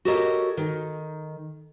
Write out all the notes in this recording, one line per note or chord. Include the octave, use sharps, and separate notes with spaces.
F#4 G4 A4 A#4 C#5 D#5
D#3